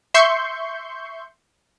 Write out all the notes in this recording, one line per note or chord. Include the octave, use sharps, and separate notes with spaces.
E5 C6 C#6 G6